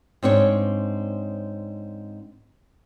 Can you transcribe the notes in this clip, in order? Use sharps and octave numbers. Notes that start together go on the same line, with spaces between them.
G#2 C4 D4 C#5